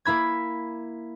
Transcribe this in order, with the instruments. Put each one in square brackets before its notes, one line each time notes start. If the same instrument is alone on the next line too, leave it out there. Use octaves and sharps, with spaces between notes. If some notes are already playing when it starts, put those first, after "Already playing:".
[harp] A#3 E4 B5 G#6